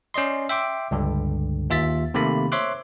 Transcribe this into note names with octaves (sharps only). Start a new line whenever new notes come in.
C#4 D5 D#5 C6
E5 G5 C6 D6
C#2 G2 D3
D#2 F4 E5 A6 B6
C3 D#3 A3 A#3 B5
C5 C#5 E5 C6 D6 F#6